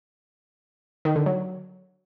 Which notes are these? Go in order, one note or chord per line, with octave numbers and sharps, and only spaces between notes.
D#3
D3
F#3